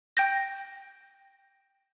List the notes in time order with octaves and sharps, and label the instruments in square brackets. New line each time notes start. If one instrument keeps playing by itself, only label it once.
[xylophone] G5 G6 A#6